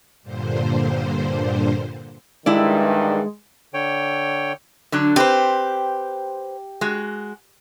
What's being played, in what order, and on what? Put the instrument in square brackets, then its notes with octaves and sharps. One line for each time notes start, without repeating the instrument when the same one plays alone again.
[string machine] G2 A#2 D3 C5
[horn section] G2 D#3 E3 [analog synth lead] G#3 [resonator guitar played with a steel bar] E4 D5
[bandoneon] D3 C#5 G5
[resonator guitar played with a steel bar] D3 F#3 D4
[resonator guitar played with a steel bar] C4 B4 C5 [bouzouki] G4
[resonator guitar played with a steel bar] G#3 F#4